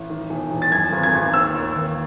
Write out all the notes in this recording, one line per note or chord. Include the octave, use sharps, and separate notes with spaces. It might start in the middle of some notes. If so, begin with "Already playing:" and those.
Already playing: A1
D#3
E1
E1
A6
F#2 G#6
G#1
G#6
G#1
D#2 E6
D#2
D#2